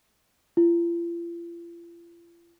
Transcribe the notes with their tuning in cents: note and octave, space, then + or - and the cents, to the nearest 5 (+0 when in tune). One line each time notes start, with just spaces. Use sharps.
F4 -45